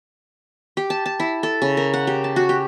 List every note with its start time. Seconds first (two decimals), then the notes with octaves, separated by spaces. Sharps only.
0.77 G4
0.90 A5
1.06 A5
1.20 E4
1.43 A4
1.62 C#3
1.77 A#4
1.94 F#5
2.07 G4
2.24 A5
2.36 F#4
2.49 G4